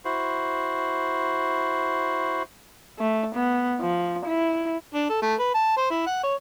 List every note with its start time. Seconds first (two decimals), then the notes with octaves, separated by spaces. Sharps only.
0.05 E4 F#4 C5
2.99 A3
3.35 B3
3.81 F3
4.25 E4
4.94 D4
5.09 A4
5.22 A3
5.39 B4
5.54 A5
5.77 C5
5.90 E4
6.06 F#5
6.23 C#5